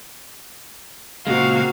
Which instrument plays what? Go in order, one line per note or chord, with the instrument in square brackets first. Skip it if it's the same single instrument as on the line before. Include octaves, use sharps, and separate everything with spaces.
[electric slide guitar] A#2 C#3 G#3 [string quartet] A#3 C4 [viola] F#4 [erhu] F5